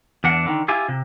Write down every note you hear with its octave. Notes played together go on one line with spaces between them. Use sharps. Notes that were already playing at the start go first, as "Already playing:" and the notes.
E2 D4 F#5
D3 D#3
E4 F4 G4 G#5
C3